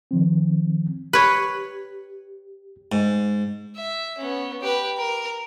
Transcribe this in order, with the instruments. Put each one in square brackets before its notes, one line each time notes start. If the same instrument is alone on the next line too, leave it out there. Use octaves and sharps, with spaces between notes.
[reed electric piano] D#3 F3 C4
[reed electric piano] G4 [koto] B4 C#5
[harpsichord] G#2
[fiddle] E5
B3 C#4
G4 B4
A#4